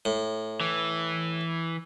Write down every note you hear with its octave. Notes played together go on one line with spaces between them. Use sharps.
A2
E3